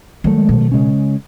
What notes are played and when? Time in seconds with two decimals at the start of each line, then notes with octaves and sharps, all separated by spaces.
0.24 D#3 F#3 G#3 A3
0.49 B2
0.72 C#3 G#3 C#4